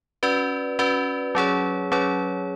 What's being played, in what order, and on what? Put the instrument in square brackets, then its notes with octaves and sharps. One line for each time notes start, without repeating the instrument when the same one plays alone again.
[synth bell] C#4 F#4 B4 D5
C#4 F#4 B4 D5
F#3 C#4 G#4 C#5
F#3 C#4 G#4 C#5